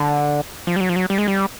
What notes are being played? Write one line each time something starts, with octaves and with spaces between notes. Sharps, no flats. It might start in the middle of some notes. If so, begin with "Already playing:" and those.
Already playing: D3
F3
G3
F#3
F3
F#3
G3
G#3
G3